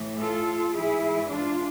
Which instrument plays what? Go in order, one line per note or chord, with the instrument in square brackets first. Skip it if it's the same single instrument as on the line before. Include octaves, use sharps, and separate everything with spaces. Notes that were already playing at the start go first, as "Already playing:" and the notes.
Already playing: [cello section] A2 E3
F4 A4
G#2 E3 E4 G#4
D4 F4